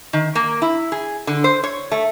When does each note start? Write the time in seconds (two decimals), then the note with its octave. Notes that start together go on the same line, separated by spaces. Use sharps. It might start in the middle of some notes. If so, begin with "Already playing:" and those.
0.13 D#3
0.35 A#3
0.62 E4
0.92 G#4
1.27 D3
1.44 C5
1.64 C#5
1.91 A3